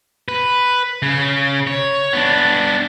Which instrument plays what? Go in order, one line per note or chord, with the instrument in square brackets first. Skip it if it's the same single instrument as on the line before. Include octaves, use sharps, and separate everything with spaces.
[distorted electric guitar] B4
C#3
C#5
B3 D4